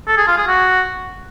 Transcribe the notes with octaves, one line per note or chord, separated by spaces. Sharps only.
A4
G#4
F4
G#4
F#4